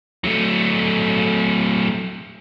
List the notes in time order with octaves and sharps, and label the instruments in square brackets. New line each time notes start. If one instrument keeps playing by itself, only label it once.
[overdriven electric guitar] F#3 A3